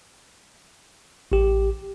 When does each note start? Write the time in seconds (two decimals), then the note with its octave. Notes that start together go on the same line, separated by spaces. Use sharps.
1.32 A1 G4